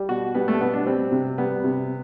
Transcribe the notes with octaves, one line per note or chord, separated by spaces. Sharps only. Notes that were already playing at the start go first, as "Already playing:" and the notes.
Already playing: G3
B2 F#4
G3 B3
A3
B2 B3
D4
G3 C4
C3
G3 B3
C3